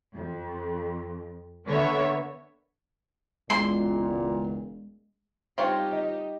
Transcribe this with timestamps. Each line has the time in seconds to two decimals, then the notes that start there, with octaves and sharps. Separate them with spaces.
0.13 F2
1.66 D3 A#3 B3 C#5 E5
3.50 E1 C#2 A#2 G#3 C6
5.58 G3 C4 D#4 F4 G4 C#5
5.93 D#5